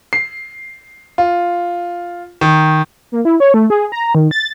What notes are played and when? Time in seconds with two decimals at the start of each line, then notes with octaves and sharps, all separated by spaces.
0.13 C7
1.18 F4
2.41 D#3
3.12 A#3
3.25 E4
3.40 C#5
3.54 A3
3.70 G#4
3.92 A#5
4.15 D#3
4.31 A6